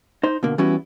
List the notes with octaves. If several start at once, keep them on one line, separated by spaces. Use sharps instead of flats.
D#4 C5
B2 D3 A#3
E3 G3 B3 C#4 E4 F#4